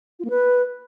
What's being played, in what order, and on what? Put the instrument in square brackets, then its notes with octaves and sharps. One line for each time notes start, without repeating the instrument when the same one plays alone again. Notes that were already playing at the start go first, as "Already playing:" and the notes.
[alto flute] F4
A#3
B4